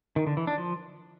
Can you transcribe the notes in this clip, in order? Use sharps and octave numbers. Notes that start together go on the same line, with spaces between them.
D#3
D3
E3
D4
F3